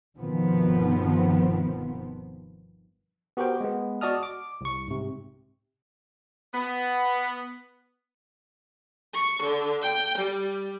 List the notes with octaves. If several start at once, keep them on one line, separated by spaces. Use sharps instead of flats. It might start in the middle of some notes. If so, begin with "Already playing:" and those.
G1 B2 D#3 F3 B3 C4
B3 F#4 G4 A#4 C5 G5
G#3 B3
F#4 D5 D#5 A5 D#6 F6
D6
C2 C#6
G#2 C3
B3
C#6
D3
G5
G3